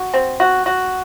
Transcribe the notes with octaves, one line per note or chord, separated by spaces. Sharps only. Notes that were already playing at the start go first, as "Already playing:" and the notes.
Already playing: F#4
C4
F#4
F#4